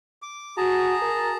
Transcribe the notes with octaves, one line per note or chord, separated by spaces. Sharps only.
D6
F#4 G#4 A5 A#5
A#4